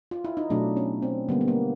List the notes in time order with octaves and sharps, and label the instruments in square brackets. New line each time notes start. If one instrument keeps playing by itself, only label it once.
[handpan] F4
E4
D#4
B2 F#3 A3 D4
C#4
C4
D3 G3 A#3 B3
B3
A#3